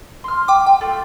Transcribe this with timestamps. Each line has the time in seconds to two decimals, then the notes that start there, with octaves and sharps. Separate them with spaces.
0.24 C6 F6
0.48 G5 D6
0.66 G5
0.81 A3 F4